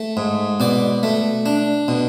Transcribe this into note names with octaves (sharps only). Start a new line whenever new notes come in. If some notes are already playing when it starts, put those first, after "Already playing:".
Already playing: A3 A5
G#2
B2 D5
A3
D4
B2